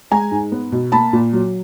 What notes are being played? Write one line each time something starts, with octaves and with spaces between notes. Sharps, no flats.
G#3 G#5 A#5
G#2
B3
B2
A#3 A5 B5
A#2
F#3